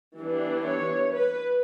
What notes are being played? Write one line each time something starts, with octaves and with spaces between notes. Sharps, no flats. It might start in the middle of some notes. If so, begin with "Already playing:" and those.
E3 G3 B3 D4
C#5
B4